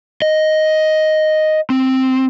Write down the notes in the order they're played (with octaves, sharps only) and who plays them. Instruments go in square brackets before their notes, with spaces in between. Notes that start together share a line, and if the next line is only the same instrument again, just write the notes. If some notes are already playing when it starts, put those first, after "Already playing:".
[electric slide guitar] D#5
C4